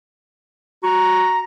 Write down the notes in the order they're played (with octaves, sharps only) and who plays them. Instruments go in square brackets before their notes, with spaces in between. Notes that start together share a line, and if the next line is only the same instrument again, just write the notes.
[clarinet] F#4 [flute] A#5